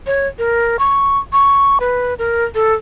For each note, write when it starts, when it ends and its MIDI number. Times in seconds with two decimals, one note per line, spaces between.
0.07 0.27 73
0.39 0.77 70
0.79 1.18 85
1.33 1.78 85
1.80 2.14 71
2.19 2.45 70
2.55 2.74 69